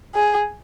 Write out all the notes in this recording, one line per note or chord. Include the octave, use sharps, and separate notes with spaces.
G#4